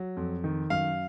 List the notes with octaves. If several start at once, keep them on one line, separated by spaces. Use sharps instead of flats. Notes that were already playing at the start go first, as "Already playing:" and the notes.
Already playing: F#3
F2
D#3
F#2 F5